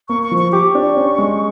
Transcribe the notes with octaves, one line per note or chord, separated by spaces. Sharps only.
A#3 C#6
C#6
F3
C#6
G4 D6
D4 C#6
C#4
G#3